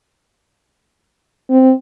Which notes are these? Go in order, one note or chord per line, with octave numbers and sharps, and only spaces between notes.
C4